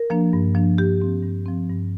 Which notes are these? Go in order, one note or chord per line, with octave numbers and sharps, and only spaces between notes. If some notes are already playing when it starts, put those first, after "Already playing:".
Already playing: A#4
F3 A#3 D4
G2
F3 A#3 D4
G2 G4
F3 C4
G2
F3 C4
G2